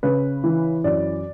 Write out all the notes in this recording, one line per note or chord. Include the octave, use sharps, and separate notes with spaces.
C#3 B4
E3
F#2 D5